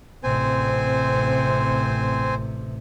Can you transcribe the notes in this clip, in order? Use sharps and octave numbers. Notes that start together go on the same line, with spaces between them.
A1 C3 C4 C5 G#5